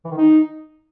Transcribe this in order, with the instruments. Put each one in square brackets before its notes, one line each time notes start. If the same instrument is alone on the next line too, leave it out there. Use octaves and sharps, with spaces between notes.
[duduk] E3
D#3
D#4